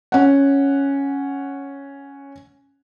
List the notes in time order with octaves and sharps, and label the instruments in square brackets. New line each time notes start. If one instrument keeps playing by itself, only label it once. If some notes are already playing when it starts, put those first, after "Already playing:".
[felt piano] C#4 F#5